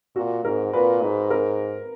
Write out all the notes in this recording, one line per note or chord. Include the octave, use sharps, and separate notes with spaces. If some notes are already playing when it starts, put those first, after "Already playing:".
A#2 F#4
G#2 A#4
A#2 B4
G#2
A#4